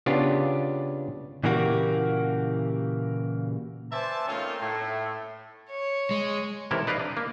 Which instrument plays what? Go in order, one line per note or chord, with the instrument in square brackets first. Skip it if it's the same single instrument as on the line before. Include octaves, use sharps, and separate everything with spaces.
[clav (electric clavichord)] C#3 B3 D4 F4 G4
[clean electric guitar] A#2 C#3 E3 A#3 F#4 G4
[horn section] B4 C5 D5 E5 G#5 A5
A3 A#3 C4 C#4 D#4 F4
A2 A3
[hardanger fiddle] C#5
[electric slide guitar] G#3
[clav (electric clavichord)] C3 D#3 E3 E4 A4 A#4
D#4 B4 D5 D#5 F5
D4
A#3